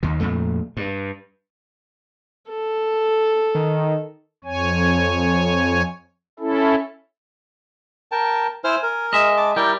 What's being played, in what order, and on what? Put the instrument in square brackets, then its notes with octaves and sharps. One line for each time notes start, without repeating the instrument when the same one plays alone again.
[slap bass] D#2 D#3
F2 A#2 A3
G2
[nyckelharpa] A4
[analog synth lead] D#3
[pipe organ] F2 C#5 G#5
C#4 E4 A4
[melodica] A#4 G5 A5
[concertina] E4 C5 F6 [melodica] G#5
[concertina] A#4
[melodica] G#3 [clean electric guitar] D#5 E5
[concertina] A5 D6
[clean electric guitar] G3 [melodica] E4 A#4 D5 [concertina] G5